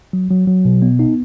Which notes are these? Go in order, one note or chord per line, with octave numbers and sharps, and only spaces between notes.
F#3
F#3
F#3
B2
B3
D#4